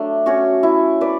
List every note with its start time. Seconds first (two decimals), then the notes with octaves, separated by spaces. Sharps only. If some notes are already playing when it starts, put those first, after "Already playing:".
Already playing: F#3 A3 D4
0.26 C#4 F#4 C#5
0.63 E4
1.01 B4 D5